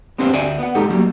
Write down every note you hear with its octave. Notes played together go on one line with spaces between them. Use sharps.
B3 C4 D4 G4 C5 F5
D2 D5 E5 G5 G#5
B3 F#5
G#3 D#4 G4 A4
F#3 G3 A3 A#3